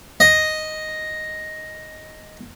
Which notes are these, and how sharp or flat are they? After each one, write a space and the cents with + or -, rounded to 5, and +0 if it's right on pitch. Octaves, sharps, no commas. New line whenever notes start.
D#5 +0